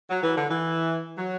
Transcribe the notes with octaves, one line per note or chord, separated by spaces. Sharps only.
F#3
E3
D3
E3
F#3